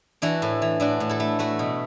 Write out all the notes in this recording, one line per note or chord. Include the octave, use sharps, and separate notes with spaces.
E3 D4 F#4
A2
E3
A2 D4 F#4
A2
E4 A4
A3
A3 F#4 B4
B2